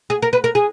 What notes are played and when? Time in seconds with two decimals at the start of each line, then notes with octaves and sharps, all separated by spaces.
0.10 G#4
0.22 A#4
0.33 B4
0.44 A#4
0.55 G#4